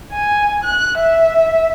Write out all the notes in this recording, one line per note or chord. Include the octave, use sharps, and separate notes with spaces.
G#5
F#6
E5